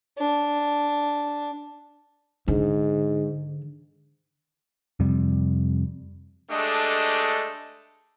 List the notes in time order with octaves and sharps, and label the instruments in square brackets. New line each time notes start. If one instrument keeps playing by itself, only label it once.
[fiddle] D4
[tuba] G#2 [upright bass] D3
[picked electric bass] F2 C3 G3
[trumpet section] G#3 A3 D4 G4 A4 D#5